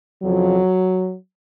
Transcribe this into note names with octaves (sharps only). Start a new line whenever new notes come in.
F2 C#3 F3 F#3